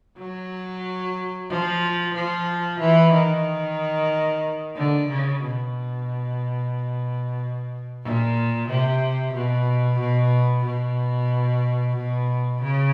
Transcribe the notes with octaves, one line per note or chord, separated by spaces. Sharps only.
F#3
F3
F3
E3
D#3
D3
C#3
B2
A#2
C3
B2
B2
B2
B2
C#3